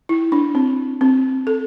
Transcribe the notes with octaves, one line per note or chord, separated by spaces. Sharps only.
E4
D4
C4
C4
A4